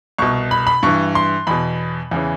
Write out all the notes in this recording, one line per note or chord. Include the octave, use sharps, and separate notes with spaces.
C2 B2 C#6
B5
B5
G2 E3 C#6
C6
E2 B2 B5
E2 C#3 E3